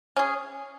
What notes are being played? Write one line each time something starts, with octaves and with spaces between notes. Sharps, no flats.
C#4 G#4